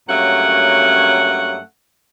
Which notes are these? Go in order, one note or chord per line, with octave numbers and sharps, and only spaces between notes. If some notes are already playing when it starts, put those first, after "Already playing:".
G2 F#3 A3 A#3 C#4 F#5